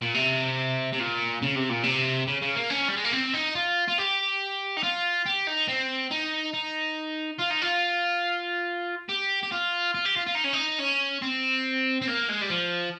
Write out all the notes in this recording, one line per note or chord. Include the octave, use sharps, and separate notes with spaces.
A#2
C3
C3
A#2
C#3
C3
A#2
C3
C#3
C#3
A#3
C#4
G3
G#3
A#3
C4
D#4
F4
F4
G4
D#4
F4
G4
D#4
C4
D#4
D#4
F4
D#4
F4
G4
G4
F4
F4
G4
F4
F4
D#4
C#4
D#4
C#4
C4
C4
A#3
G#3
G3
F3